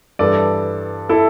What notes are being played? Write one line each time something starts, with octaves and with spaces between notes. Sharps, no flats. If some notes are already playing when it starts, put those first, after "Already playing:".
G2 E3 A4 D5
E4 A4